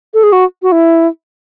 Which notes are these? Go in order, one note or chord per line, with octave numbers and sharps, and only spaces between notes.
A4
G#4
F#4
F#4
E4